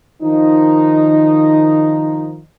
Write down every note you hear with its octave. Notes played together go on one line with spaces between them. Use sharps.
D#3 F3 D#4